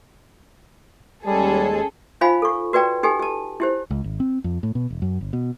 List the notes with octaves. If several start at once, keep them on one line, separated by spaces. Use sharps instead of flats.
D#2 G3 G#3 C#4 G#4 A4 A5
D#4 F4 C5 F5 G#5 B5
A4 C#6
F#4 B4 D5 G5 A#5
D#4 G4 A4 G#5
G4 A5
E4 G4 C5
C#2
G#1
C4
F2
A2
B2
E1
F#2
G1
B2